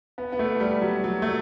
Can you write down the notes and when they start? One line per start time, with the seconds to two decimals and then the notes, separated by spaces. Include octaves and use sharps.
0.18 B3
0.32 B3
0.39 A3
0.60 G3
0.82 F#3
1.04 F#3
1.22 A3